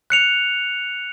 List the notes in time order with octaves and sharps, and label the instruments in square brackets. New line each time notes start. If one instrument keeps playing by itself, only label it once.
[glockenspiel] F#6 C#7 F7